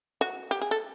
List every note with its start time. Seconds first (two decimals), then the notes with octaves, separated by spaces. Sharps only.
0.21 F#4
0.51 G4
0.61 G#4
0.71 A4